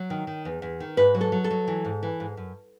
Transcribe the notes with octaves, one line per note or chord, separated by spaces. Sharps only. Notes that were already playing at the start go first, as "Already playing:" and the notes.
Already playing: F#3 C#5
D#3
D#3
E2
E2
D#3
G#2 B4
F#3
A4
F#3
A4
F#3
E3
G#2
E3
G#2
F#2